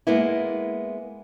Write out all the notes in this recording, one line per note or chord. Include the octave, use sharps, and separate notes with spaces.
G#3 A#3 B3 E4